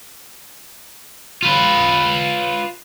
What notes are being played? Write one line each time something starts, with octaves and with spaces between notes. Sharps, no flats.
F4 B4